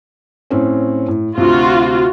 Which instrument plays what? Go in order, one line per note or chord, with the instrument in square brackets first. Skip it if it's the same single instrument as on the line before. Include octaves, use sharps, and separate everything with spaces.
[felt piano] A2 C4 C#4
A2
[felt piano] D2 C3 [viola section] F4 F#4